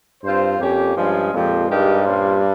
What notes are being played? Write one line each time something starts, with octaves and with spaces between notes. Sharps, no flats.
G2 G3 C4 F4 C5
F2 A#3 C#4 G4
G2 F3 G#3 C#4 F4 G#4
F2 A#2 F3 G#3 C4 G4
G2 G#3 D#4 G4 A#4
A#2 G3 C#4 F4 C5